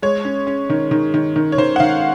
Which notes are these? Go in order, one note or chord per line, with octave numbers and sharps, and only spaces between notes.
G#3 C#5
C#4
C#4
D#3
D#3
D#3
D#3
C#5
D#3 C5
F#5
D#3 F5